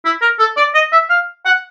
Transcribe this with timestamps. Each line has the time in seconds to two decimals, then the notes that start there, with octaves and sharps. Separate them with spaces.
0.05 E4
0.22 A#4
0.39 A4
0.57 D5
0.74 D#5
0.92 E5
1.10 F5
1.45 F#5